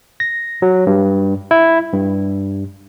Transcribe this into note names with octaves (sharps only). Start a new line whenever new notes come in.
A#6
F#3
G2
E4
G2